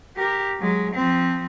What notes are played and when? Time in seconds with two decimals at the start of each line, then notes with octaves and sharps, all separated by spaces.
0.16 G4 A#4
0.59 F#3 G#3
0.95 F3 C4